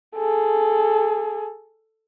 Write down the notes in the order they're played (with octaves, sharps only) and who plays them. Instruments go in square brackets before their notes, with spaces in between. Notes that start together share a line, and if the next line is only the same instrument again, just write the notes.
[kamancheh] G#4 A4